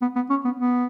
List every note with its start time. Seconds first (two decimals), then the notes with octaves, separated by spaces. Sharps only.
0.02 B3
0.16 B3
0.30 C#4
0.45 B3
0.60 B3